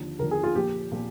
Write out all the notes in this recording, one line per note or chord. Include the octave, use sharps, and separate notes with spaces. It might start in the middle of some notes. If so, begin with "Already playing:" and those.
Already playing: D#2 D3 F3
D#2 D3 F3 A#4
G#4
F4
A#1 A#2 F3 G4
A#2 F3